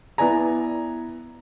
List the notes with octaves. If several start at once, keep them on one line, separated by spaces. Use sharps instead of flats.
B3 E4 D5 G#5 A#5